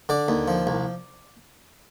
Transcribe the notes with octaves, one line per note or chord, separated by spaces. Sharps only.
D3 D5
D#2
F3
C2